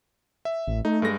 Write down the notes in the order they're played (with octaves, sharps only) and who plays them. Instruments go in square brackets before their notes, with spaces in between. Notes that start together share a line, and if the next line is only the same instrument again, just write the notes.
[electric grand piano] E5
[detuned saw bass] A1
[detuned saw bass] A3 [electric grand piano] D#4
[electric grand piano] G2 G#3 A#6